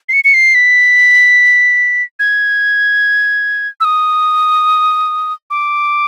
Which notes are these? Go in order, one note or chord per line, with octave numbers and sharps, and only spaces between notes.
C7
C#7
C#7
C7
B6
G#6
E6
D#6
D6